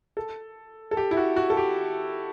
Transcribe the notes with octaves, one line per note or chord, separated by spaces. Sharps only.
A4
A4
G4
E4
F#4
F#4
A4
G4